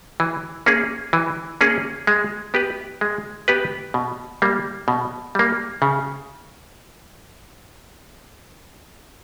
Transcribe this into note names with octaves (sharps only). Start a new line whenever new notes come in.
E3
A#3 C#4 G#4
E3
A#3 C#4 G#4
G#3
B3 G4 B4
G#3
B3 G4 B4
B2
G3 A#3
B2
G3 A#3
C#3